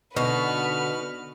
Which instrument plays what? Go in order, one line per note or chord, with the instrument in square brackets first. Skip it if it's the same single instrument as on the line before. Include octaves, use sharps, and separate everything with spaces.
[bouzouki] B2 [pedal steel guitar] D3 D#4 [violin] F#4 B4 [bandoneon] F6